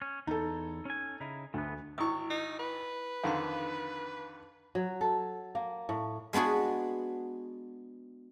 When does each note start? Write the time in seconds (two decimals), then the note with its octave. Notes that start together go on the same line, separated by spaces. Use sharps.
0.02 C#4
0.27 E2 D#4 A4
0.85 C#4 G#5
1.20 C#3 D#4 E4
1.54 D2 A3 B3
1.98 G#1 E4 C#6 D#6
2.30 D#4
2.59 B4
3.24 F2 D3 D#3 F5 C6
4.75 F#3
5.01 A4
5.55 A#3
5.89 A2
6.33 G#3 B3 D4 F#4 G#4